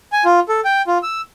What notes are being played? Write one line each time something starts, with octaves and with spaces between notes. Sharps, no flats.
G#5
F4
A4
G5
F4
E6